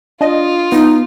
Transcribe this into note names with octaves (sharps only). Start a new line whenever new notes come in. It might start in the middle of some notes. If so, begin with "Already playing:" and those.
D4 F4 D#5
B3 D#4